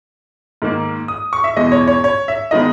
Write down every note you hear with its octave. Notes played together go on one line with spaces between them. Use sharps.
G#2 D#3 A#3
D#6
C#6
E5
E2 B2 G#3 D#5
C#5
C#5
C#5
E5
D#3 G#3 B3 D#5